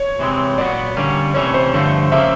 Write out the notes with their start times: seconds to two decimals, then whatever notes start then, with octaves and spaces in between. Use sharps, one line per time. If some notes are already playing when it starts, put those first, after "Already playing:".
Already playing: C#5
0.19 C3 E3 G#3 C4
0.58 A#2 F#3 B3 D5
0.97 D3 G3 A#3 C#4
1.34 C3 E3 A3 C#4 C#5
1.54 C5
1.73 G2 D3 F3 A3
2.12 C#3 F3 A#3 E5